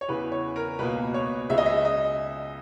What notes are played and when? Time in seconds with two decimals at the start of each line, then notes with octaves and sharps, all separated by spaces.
0.01 C#5
0.08 E2 C#3 E3 B4
0.32 C#5
0.56 A#4
0.79 C#2 B2 A#3 B4
1.14 C#5
1.50 C#2 C#3 G#3 E5
1.58 D#5
1.66 E5
1.85 D#5